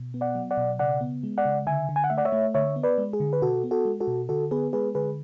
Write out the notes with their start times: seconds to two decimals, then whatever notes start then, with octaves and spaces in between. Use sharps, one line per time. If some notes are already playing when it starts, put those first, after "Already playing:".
Already playing: B2
0.14 B3
0.21 D5 F#5
0.35 F#3
0.51 D5 F#5
0.57 B2
0.79 C#3 D5 F#5
1.01 B3
1.23 G#3
1.38 D5 F#5
1.45 C#3
1.67 D3 E5 G#5
1.89 D3
1.96 G#5
2.04 F#5
2.10 A3 E5
2.18 D5 F#5
2.25 C#5 E5
2.32 A3
2.54 D3 C#5 E5
2.76 B3
2.83 B4 D5
2.98 G#3
3.13 G#4
3.20 D3
3.33 B4
3.42 B2 F#4 A4
3.64 B3
3.71 F#4 A4
3.85 G#3
4.00 F#4 A4
4.07 B2
4.29 D3 F#4 A4
4.51 B3 G#4 B4
4.73 G#3 G#4 B4
4.95 D3 G#4 B4